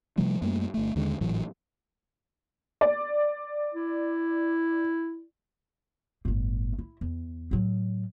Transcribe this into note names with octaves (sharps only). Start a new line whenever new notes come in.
C3 F3 G3 A3
F#2 G3 A3 A#3
G1 A3
D#2 D3 G#3
G#1 A2 E3 F#3
D5
E4
G1 A2
E4
E2
A2 F#3